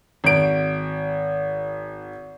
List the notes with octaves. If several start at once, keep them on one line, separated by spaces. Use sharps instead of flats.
G#1 D7